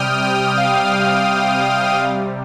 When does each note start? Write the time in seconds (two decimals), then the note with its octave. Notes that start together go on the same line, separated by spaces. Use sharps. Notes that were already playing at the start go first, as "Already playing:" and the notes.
Already playing: C3 G3 G5 D#6 F6
0.22 G5
0.57 F5
1.97 C3 G3